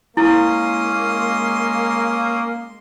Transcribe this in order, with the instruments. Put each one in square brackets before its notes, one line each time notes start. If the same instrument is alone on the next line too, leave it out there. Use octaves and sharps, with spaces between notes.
[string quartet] G#3 C6 [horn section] A#3 [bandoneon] C#4 D#6 [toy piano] E4